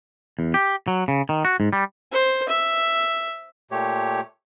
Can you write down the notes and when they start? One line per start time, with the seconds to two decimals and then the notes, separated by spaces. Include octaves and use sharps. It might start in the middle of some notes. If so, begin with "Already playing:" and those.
0.39 E2
0.54 G4
0.88 F#3
1.08 C#3
1.29 D#3
1.45 F#4
1.60 G#2
1.73 G3
2.12 C5
2.49 E5
3.71 A#2 A3 G4 C#5